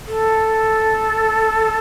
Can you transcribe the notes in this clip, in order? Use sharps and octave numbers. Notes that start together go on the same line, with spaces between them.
A4